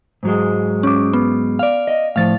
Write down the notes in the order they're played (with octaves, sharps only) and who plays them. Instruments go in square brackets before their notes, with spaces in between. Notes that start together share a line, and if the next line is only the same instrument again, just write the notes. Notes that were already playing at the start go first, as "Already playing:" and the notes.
[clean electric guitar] G#2 F#3 G#3
[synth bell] C#4 D6
B3
D5 F5
[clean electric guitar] D#5
[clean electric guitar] A2 F3 [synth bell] F5 A6